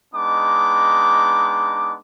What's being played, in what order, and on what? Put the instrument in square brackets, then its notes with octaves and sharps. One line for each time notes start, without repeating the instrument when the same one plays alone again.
[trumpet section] G#3 B3 D4 D#4 D6